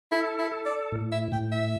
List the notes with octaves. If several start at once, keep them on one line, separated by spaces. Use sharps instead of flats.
E4 A4
E4
A4
D5
A2
E5
A2 G5
E5